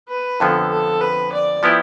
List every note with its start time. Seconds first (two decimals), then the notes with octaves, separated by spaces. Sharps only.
0.09 B4
0.40 F2 D3 F3 B3 A4
0.72 A4
1.01 B4
1.32 D5
1.63 F3 B3 E4 G4